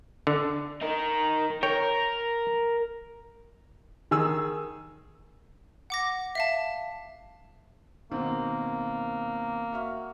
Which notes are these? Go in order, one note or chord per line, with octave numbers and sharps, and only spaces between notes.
D3
D#4 A#4
A#4 C#5 G5
D#3 G#4 E6
F#5 D6 A#6
E5 F5 A5
B2 D#3 A#3 C4
F#4 E5 F6